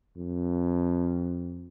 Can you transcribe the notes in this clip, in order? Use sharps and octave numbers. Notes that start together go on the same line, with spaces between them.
F2